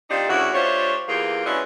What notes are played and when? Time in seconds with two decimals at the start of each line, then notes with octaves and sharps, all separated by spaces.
0.10 D#3 C4 D4 D#4 F4 G4
0.29 D2 C#3 E4 F#4
0.54 A3 D4 F4 G4 C5 C#5
1.08 E2 E3 A#3 F4 G4 G#4
1.45 G#3 C#4 D4 E4 F#4 B4